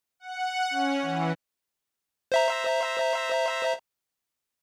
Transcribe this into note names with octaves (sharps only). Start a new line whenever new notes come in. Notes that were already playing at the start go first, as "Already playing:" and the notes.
F#5
C#4
E3
C5 E5 A#5